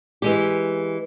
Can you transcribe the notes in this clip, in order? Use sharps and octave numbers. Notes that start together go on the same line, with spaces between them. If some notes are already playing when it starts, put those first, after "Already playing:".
E3 G#3 G4